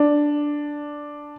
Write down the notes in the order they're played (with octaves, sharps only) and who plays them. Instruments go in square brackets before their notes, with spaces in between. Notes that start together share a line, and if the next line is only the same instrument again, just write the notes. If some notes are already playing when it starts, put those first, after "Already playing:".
Already playing: [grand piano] D4